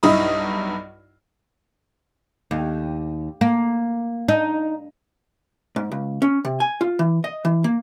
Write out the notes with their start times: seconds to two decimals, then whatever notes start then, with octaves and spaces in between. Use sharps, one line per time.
0.03 B1 G2 D#4 E4 B5 D#6
2.51 D#2
3.41 A#3
4.29 D#4
5.76 G#2
5.92 C#2
6.22 C#4
6.45 C3
6.60 G#5
6.81 F4
6.99 E3
7.24 D#5
7.45 E3
7.64 A#3